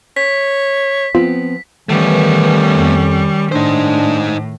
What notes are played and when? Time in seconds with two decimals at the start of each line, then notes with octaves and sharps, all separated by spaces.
0.17 C#5 B6
1.15 F3 B3 C4 F4
1.89 D#3 E3 G3 A3 B3 C#4
2.75 F2
3.52 A2 D4 D#4 C5